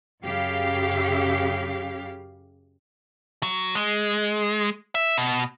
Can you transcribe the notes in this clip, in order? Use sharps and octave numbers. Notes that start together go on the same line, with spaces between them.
F#2 C#3 G4 F5
F#3
G#3
E5
B2